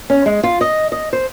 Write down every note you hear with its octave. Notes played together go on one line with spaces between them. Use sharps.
C#4
G#3
F4
D#5
D#5
C5